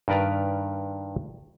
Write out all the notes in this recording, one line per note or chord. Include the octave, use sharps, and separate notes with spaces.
G2 D#3 A#4 B4 D5 A#5